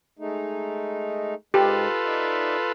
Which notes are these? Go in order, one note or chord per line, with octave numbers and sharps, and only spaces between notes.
G#3 A3 D#4
G#2 G#3 F4 G4 A4 B4
D#4 D5 E5